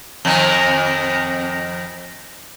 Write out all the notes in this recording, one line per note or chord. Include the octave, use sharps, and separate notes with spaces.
F2 D#3